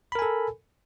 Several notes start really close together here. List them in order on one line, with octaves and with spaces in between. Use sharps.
B5 A#4 G#5 A4